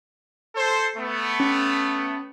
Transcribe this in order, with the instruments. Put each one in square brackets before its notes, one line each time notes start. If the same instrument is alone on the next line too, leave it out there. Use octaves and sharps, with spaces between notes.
[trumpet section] A4 C5
A3 B3
[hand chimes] C#4